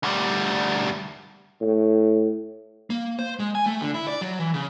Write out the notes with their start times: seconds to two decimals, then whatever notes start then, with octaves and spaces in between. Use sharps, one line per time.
0.03 D2 G3
1.61 A2
2.90 A#3
3.19 C5
3.39 G#3
3.55 G#5
3.66 A3
3.81 D3
3.94 E4
4.08 D5
4.21 F#3
4.39 E3
4.54 C#3